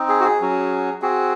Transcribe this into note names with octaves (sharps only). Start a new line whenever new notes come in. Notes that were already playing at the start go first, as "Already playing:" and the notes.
Already playing: C4 D#4
G#4
F#4
G#4
F#3 C#4 F#4
C4 F#4 G#4